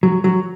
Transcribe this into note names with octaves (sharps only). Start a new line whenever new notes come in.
F#3
F#3